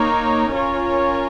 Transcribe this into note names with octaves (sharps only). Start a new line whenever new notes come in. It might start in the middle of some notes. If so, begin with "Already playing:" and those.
Already playing: A#3 D#4 A#4 C#5
C#4 F4 A#4 C#5